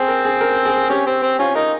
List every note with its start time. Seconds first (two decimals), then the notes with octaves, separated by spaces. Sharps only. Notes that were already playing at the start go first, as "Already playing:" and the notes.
Already playing: C4 G#4
0.08 A#4
0.25 G#4
0.41 A#4
0.66 G#4
0.90 C#4 G4
1.07 C4
1.23 C4
1.39 C#4 F4
1.55 D#4 A#4